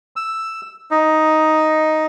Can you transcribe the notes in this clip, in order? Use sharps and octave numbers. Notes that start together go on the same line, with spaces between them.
E6
D#4